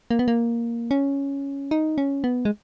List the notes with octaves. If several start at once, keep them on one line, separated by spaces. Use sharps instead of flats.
A#3
B3
A#3
C#4
D#4
C#4
B3
G#3